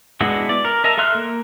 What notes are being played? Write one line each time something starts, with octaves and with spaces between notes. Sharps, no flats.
G#3 B3 D4 E4 F#4
D5
A#4
A#4 D#5 E5 A5 A#5
A4 E5 C6 F6 F#6
A#3